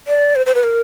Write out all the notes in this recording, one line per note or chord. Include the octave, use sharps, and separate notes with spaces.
D5
C5
C5
B4
A#4